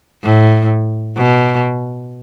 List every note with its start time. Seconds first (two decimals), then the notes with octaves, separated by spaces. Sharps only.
0.24 A2
1.17 B2